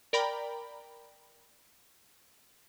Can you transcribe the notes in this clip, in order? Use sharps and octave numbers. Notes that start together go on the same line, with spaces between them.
A#4 D5 G5 A#5 B5